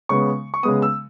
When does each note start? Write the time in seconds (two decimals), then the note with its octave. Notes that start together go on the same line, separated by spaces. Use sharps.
0.09 C#3 G#3 B3 C#6
0.54 C#6
0.63 C#3 G#3 B3 D#6
0.82 E6